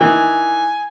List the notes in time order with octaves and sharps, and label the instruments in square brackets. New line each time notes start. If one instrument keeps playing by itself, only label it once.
[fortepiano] D#3 E3 [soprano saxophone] G#5